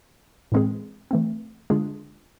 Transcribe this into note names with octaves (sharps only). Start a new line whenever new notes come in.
A2 E3 G#3 C4 G#4
E3 A3 C4
D3 G#3 D4 F4 G#4